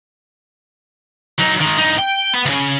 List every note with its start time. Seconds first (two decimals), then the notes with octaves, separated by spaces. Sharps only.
1.39 F#3 D#4
1.61 D#3 G#3
1.78 G2 D#4
1.99 G5
2.34 B3
2.46 D2 C#3